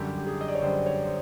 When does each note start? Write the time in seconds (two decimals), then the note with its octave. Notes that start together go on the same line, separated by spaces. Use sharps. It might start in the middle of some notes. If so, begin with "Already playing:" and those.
Already playing: F#2 D3 G3 G4
0.18 G4
0.27 G#4
0.41 D#5
0.48 D5
0.55 C#5
0.62 F#2 D3 G3 C5
0.86 C#5
1.06 C5